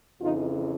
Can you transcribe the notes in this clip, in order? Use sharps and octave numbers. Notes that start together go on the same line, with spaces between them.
F2 C#3 E3 D#4 F4